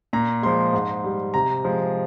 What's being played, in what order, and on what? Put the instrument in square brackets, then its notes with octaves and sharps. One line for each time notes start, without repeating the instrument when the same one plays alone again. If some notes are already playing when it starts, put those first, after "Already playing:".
[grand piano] A#2 A#5
F3 G#3 C6
G#2
G3
C3 A#5
F3 G#3